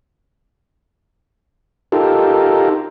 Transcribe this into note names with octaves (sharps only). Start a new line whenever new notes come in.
D#4 F4 G4 A4 A#4